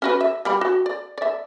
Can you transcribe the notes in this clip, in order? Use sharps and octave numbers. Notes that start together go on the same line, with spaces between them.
C#4 F#4 B4
E5
G3 G4 B5
F#4
D5
D5 E5